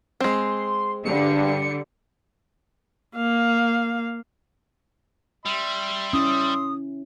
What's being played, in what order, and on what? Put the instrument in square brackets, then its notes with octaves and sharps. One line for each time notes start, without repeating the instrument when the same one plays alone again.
[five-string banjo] G#3 C4 [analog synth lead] C6
[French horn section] G2 [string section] D3 G3 [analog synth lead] C#7
[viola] A#3 F5
[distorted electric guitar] G3 [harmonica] E5 C6
[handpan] C#4 E4 [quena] D#6